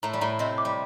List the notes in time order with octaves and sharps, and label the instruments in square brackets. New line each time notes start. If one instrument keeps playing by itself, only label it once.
[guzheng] A2 A3 [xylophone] A#5
[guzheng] G3
[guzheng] A2 A3 [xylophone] A#5
[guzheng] C3 C4 [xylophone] D#5
[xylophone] D6
[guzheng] G3